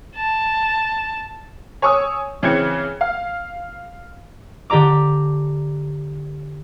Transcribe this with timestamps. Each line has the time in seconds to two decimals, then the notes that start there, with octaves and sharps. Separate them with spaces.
0.16 A5
1.82 C#5 G#5 C#6 D#6 E6
2.43 C#3 E3 C4 C#4 G#6 C#7
3.01 F5
4.70 D3 G4 D5 A#5 D6